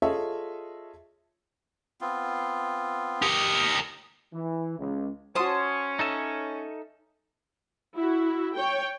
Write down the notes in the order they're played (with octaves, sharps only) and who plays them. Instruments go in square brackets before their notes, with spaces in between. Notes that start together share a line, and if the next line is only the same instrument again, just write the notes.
[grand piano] F4 G#4 A4 C#5 D#5 E5
[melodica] B3 C4 F4
[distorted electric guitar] G4 A#4 [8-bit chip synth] D#6 C#7
[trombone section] E3
C#2
[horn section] C#4 [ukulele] F#4 C5 [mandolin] A5 C6 D#6
[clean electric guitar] D#4 A4 E5
[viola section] E4 F#4
C#5 G5